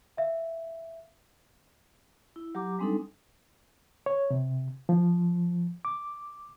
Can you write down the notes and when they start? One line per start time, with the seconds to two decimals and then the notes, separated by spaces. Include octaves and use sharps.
0.17 E5 F5
2.36 E4
2.55 F#3 G4 A#5 D6
2.79 G3 G#3 C4 D4 D#4 A4
4.06 C#5
4.31 C3
4.89 F3
5.85 D6